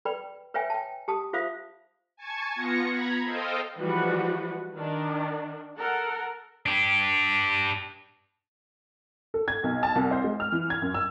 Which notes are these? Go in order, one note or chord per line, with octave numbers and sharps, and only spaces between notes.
B4 D5 G5 B5
B4 C#5 E5 G5 G#5
G5 A5
G4 A5 D#6
F4 C5 E5 F5 D#6
G#5 A5 C#6 G#6
B3 F4 A#6 C#7
A#5 B5 G#6
A4 C5 D#5 F5 G5
E3 F3 G3 G#3 F#4 B4
D#3 D4
A4 A#4 F#5
D4 G4
A4
G#6
B1
A5
C2
C5
G#3
F6
E3
G#6
F#2
E6